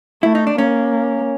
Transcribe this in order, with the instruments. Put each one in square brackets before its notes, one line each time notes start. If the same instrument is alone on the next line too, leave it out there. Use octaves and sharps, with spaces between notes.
[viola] A3 [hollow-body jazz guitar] E4
[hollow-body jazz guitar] D#4
D4
[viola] A#3 [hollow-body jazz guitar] C#4